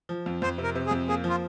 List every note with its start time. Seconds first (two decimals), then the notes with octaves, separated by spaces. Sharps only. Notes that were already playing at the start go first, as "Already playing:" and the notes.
0.09 F3
0.26 F2
0.42 F2 C5
0.58 C3
0.63 A#4
0.75 C3
0.86 G#4
0.91 F2
1.08 A#3 G#4
1.24 F3
1.29 F4